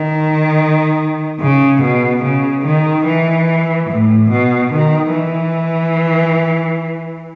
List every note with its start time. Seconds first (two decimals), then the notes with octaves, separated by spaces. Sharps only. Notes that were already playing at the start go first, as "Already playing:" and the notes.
Already playing: D#3
1.40 C#3
1.82 B2
2.24 C#3
2.65 D#3
3.06 E3
3.89 A2
4.30 B2
4.72 D#3
5.14 E3